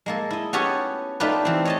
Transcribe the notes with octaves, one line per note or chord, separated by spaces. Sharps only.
G#3 A#3 A4
E4 D#5
B3 C#4 F#4 G4 A4 C#5
A3 D4 D#4 F4 G4 B4
E3 C4
C#5 D#5 A5